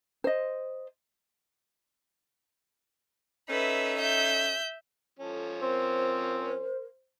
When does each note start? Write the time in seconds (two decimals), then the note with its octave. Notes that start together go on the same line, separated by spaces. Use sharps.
0.24 C5 D#5
3.49 C#4 D#4 A4 B4 E5
3.98 E5 G6
5.19 F3 C#4 A4
5.62 C4 A#4 C5